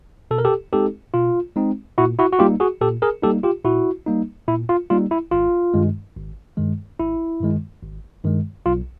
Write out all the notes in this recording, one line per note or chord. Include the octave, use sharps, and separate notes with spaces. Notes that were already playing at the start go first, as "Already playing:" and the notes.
B2 A4
A#4
G4 A4
G#3 C4 D#4 G4 A4
B2 F4
G#3 C4 D#4
A#2 E4 F#4
E4 F#4
F#4
G3 A#3 D#4 F4 G4
F#4 G#4
A#2 G4 A4
G#4 A#4
G3 A#3 D#4 G4 A4
F4 G4
A#2 E4 F#4
G3 A#3 D#4
A#2 E4
F4
G3 A#3 D#4 F4
E4
G#1 F4
G2 D#3 G#3
G#1
G2 D#3 G#3
G#1 E4
G2 D#3 G#3
G#1
G2 D#3 G#3
B1 F4